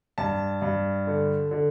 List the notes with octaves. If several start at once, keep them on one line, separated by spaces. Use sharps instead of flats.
G2 A5
G2
D3
D3